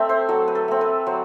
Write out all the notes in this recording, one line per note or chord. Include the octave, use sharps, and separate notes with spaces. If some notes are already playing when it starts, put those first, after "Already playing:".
Already playing: A3 C4 E5
C5
F#3 A4
B4
A4
A3 C4
B4
F#3 C5